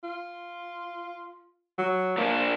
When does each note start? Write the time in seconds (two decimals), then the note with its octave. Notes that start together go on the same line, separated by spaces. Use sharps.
0.03 F4
1.78 F#3
2.18 A#2 A#3 D4